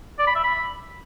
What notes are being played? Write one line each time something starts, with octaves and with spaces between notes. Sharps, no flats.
D5
B5
E5
B5